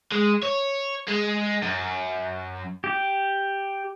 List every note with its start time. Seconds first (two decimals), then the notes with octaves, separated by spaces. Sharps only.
0.12 G#3
0.43 C#5
1.08 G#3
1.63 F#2
2.84 G4